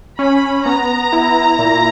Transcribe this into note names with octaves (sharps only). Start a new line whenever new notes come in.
C#4 B5
B3 A#5
E4
A#2